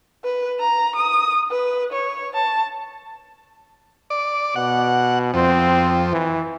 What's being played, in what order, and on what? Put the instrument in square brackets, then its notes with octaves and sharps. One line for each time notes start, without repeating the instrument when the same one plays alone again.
[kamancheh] B4
A#5
D#6
B4
C#5
A5
[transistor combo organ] D5
[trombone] B2 [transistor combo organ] F#5
[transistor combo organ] F2 [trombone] C4
[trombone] E3